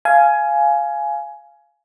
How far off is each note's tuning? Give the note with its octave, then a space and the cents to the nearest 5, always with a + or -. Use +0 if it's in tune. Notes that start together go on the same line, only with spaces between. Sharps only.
F5 -10 G#5 +15